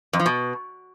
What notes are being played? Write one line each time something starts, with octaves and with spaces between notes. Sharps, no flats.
F2
F3
B2